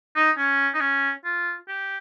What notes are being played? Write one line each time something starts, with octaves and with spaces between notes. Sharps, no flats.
D#4
C#4
D#4
C#4
F4
G4